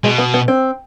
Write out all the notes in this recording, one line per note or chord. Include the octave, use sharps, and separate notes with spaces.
B2 G#3
B3
B3
C4